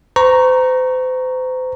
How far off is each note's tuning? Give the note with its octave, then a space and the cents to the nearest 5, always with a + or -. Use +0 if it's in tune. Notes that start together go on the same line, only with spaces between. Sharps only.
C5 -40 A#5 +0 C#6 +0